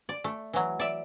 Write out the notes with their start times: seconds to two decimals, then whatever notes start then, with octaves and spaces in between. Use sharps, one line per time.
0.09 D5
0.24 A3
0.53 E3 F#3
0.79 D5 E5